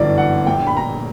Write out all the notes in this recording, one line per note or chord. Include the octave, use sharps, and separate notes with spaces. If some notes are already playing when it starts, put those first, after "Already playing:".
Already playing: G1 F#2 E3 D5
F#5
A#1 A#2 G5
B5
A#5